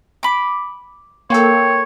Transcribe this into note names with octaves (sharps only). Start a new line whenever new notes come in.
B5 D6
A#3 A4 A#4 C#5 G5 C6